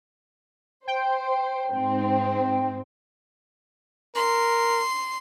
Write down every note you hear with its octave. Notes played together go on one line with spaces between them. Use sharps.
C5 G5
G#2 C4
A#4 C6